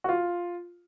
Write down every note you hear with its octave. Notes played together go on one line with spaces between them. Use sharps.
F#4
F4